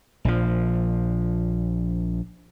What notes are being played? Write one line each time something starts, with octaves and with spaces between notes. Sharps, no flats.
A#1 F3